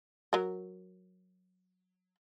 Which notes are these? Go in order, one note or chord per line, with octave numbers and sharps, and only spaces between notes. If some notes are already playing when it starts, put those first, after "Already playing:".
F#3 A#4